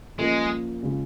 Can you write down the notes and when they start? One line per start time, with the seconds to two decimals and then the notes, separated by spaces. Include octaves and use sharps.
0.18 A#2 F3 G#3 A#3 C#4
0.82 C#3 G#3 C#4 F4